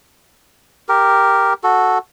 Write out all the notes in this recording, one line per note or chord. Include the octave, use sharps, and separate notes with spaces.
G4 A#4
F#4 A4